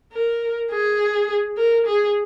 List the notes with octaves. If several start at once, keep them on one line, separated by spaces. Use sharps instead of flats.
A#4
G#4
A#4
G#4